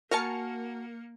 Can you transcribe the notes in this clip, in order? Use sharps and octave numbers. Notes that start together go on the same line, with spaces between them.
A#3 F#4 A#4 G#5 A5 F6 C#7